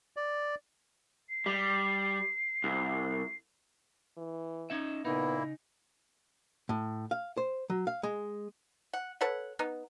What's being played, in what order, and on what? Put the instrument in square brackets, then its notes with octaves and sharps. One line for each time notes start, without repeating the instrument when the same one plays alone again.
[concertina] D5
[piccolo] C7
[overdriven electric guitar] G3
C2
[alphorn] E3
[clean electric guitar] C#4 D#4 E5
[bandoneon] A#2 A#3 E4 [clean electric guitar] C#3 D#4 [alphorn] B3
[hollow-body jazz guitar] A2
F5
C5
F#3
F5
G#3
[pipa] F#5
A4 B4 C#5 F#5
B3 D#4